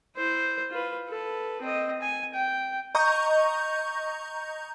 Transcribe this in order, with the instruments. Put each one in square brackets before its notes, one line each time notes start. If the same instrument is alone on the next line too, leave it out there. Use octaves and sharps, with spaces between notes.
[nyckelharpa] E4 C5
F4 B4
A4 B4
C4 D#5
G#5
G5
[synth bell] D#5 A#5 C#6 G6